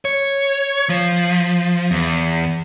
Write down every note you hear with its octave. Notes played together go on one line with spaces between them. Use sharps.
C#5
F3
E2